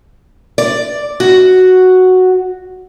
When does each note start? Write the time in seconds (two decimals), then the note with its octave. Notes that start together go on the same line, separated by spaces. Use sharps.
0.58 D5
1.20 F#4